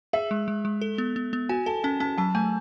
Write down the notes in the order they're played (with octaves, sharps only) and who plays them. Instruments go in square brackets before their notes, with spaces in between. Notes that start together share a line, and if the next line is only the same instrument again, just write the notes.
[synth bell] G#4 [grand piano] E5
[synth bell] G#3
G#3
G#3
A4
B3
B3
B3
[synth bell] F#4 [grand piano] G#5
[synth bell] A4 [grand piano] A5
[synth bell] C#4 [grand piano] A5
[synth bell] C#4 [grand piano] A5
[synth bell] F#3 [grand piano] A5
[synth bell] A3 [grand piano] G#5